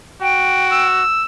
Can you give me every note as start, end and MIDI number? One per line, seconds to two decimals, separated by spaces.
0.21 1.03 66
0.21 0.86 79
0.71 1.26 88